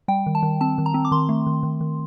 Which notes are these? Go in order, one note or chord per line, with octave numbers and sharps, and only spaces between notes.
G3 G5
D#3
A5
D#3
C4 A5
D#3
A#5
C4
D6
D#3 C6
A3
D#3
D#3
D#3